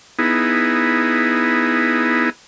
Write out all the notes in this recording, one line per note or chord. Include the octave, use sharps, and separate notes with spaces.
B3 D#4 E4 G#4